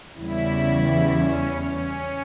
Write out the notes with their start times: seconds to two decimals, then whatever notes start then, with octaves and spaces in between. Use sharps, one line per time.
0.16 E2 C#3 G3 E4
1.14 C#4
1.62 C#4